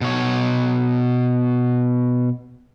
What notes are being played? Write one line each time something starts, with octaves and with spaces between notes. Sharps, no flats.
B2 C#5